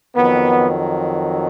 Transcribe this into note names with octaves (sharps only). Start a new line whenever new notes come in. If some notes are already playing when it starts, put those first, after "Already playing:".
F2 D#3 F#3 B3